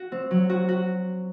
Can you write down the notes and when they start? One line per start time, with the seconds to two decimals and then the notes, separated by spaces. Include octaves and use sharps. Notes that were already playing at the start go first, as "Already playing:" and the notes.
Already playing: F#4
0.12 C4
0.31 F#3
0.50 F#4
0.69 F#4